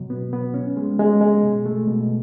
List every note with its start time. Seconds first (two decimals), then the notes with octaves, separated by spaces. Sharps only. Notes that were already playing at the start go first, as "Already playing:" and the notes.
Already playing: B2 F#3
0.10 B3
0.33 B3
0.54 C#4
0.77 G#3
0.99 G#3
1.21 G#3
1.43 B2
1.66 A3
1.87 B2